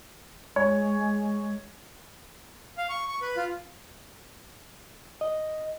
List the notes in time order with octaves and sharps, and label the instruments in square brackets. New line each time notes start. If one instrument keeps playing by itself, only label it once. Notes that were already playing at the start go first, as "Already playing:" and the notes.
[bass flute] G#3 [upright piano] C#5
[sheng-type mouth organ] F5
C#6
C#6
B4
F4
[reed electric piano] D#5